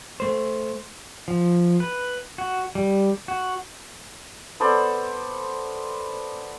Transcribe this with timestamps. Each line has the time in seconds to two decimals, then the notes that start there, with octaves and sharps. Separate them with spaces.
0.20 A3 C5
1.28 F3
1.80 B4
2.38 F#4
2.75 G3
3.28 F#4
4.60 B3 A4 C5 D5